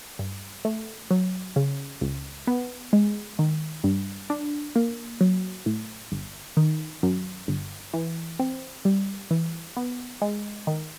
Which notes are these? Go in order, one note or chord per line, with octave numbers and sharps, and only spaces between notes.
G2
A3
F#3
C#3
C#2
B3
G#3
D#3
G2
D4
A#3
F#3
A2
G1
D#3
F#2
G1
E3
C4
G3
E3
B3
G#3
D#3